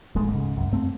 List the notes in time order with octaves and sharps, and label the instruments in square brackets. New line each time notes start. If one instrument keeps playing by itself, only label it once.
[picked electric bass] D1 A1 G#3 A3
G#2 C#3
C2 F#2
G2 A3 C4